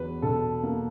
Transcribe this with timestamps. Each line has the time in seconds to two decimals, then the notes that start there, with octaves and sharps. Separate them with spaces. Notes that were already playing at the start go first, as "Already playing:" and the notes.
Already playing: E2 F#3 B4
0.22 B2 A4
0.63 A#3